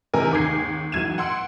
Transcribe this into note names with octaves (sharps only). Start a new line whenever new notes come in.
C3 E3 A#4 G#5
D#2 G#2 D6 G6 G#6 C7
B1 E3 F#3 G#6 D#7 E7
F#5 C6 E6 D7